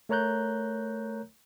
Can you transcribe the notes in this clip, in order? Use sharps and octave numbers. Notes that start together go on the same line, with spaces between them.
A3 A#4 C#5 A#5 F#6 G6